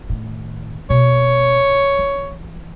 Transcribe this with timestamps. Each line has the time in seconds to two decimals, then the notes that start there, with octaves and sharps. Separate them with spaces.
0.09 A2 D#3
0.90 B2 C#5
1.99 E3